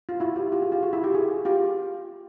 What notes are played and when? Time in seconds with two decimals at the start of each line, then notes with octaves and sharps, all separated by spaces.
0.09 F4
0.20 E4 F#4
0.36 F4 G4
0.52 F4 G4
0.62 F#4 G#4
0.72 F4 G4
0.82 F#4 G#4
0.93 E4 F#4
1.03 F4 G4
1.14 F#4 G#4
1.45 F4 G4